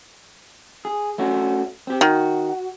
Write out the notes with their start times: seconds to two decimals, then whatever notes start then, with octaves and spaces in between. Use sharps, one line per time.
0.85 G#4
1.18 A3 C#4 F#4
1.87 C4 G4
2.01 D#3 F#4